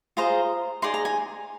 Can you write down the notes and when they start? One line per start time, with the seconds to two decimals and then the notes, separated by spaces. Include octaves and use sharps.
0.17 F4 G#4 C5 D#5 A#5
0.82 D#4 G#4 D5 C6
0.94 A#5
1.05 G#5